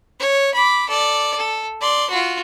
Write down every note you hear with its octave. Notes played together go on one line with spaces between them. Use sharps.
C#5
B5 D6
A4 D5
A4
D5 C6
F4 F#4